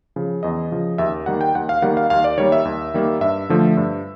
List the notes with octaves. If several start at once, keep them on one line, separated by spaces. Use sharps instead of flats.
C#3 F3
E2 D#5
C#3 F3
D#2 E5
D#3 G3 A#3 F#5
G5
D#2 F#5
F5
D#3 G3 A#3 F#5
F5
D#2 F5
D5
D#3 G3 A#3 C#5
E5
D#2
D#3 G3 A#3
G2 E5
D3 F3 A3
G2